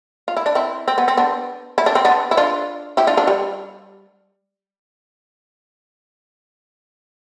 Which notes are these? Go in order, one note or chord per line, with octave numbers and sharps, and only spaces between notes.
F4
E4
D4
C4 E4
C4
B3
C4
B3 D4
E4
D4
C4
B3 D4
E4
D4 F4
E4 G4
D4 F4
D4 F4
G3